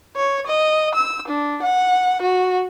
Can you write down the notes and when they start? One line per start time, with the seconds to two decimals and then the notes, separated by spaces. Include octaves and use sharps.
0.16 C#5
0.47 D#5
0.95 E6
1.28 D4
1.63 F#5
2.22 F#4